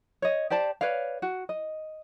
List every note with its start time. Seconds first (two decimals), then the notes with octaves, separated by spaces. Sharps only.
0.22 C#5 D#5
0.50 G4 C5 D5 A5
0.81 B4 C#5 D5 F5
1.22 F#4
1.49 D#5